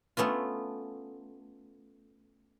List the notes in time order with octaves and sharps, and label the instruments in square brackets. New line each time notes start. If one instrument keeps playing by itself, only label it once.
[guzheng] A3 B3 C#4 F4